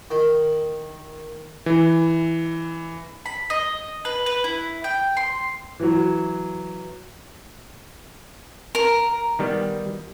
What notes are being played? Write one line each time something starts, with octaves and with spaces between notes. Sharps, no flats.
D#3
E3
B5
D#5
B4
B4
E4
G5
C6
E3 F#3
A#4 A#5
D#3 G3 B3